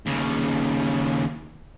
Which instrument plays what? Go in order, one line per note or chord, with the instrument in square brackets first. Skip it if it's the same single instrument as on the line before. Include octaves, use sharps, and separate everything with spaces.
[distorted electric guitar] D#2 C#3